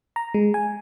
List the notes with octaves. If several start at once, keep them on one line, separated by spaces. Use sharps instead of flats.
A#5
G#3
G#5